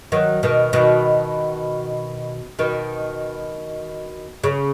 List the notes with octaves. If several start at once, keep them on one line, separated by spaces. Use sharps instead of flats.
D#3 F#3
B2 D#3
B2 D#3
B2 D#3
C#3